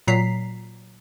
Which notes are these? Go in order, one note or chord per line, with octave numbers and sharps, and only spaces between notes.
A#2 F#3 A#5 B6 C7